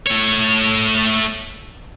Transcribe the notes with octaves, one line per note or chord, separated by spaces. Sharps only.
A3 C#5